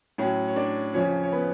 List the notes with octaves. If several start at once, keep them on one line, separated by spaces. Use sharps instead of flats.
A2 F#3 C#4 C#5
C#5
D4 D5
F2 C#3 F3 C#4 C#5
C#5
B3 B4